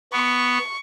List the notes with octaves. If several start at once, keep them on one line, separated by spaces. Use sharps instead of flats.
B3 C#6